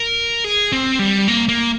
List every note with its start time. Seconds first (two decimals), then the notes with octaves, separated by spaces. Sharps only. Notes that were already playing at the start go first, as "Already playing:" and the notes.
Already playing: A#4
0.44 G#4
0.72 C4
0.99 G3
1.28 A#3
1.48 A#3